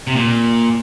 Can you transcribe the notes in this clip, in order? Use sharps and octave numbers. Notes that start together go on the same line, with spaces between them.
C3
A#2